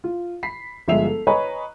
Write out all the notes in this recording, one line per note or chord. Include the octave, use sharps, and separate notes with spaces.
F4
B5 B6 C7
G1 F3 G#3 E5 C7 F7
A4
B4 C#5 D#5 G#5 A#5